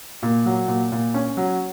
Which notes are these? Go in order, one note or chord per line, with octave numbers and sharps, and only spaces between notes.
A#2
F#3
A#2
A#2
C#4
F#3